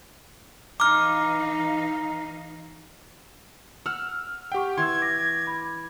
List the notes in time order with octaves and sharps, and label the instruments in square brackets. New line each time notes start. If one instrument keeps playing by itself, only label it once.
[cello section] E3 D#4 F5 [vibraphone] A#5 [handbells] D6 F6
[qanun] F#5 [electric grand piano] E6 F6
[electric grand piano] G4 G5 [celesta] F#5 C#6
[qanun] E3 [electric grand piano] C6 E6 [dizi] G#6
[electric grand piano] D6 [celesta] A#6
[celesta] B5 G#6